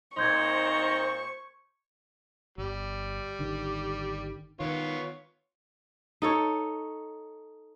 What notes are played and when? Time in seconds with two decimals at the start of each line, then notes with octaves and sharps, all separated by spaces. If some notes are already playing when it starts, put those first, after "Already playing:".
0.17 A#2 C4 D#4 C5 C6 C#6 G6 G#6
2.58 G1 G3
3.39 G#1 D3 D#3
4.60 D#3 B3 F4 C#5
6.22 D#4 A4 C#5